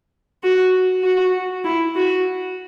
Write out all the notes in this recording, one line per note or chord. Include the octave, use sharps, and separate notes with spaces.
F#4
F#4
E4
F#4